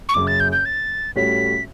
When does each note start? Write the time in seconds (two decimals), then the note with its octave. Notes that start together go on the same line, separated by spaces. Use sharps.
0.09 C#6
0.14 F#1 F#2 C#3 D6
0.27 A6
0.40 G6
0.52 G6
0.65 A6
1.16 A2 G3 C#4 F#4 C#5 B6